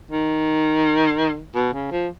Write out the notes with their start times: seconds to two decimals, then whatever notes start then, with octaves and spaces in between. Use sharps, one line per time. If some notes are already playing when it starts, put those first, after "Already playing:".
0.11 D#3
1.55 B2
1.74 C#3
1.91 F3